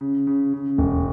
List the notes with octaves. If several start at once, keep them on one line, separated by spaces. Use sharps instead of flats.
C#3
C#3
C#3
E1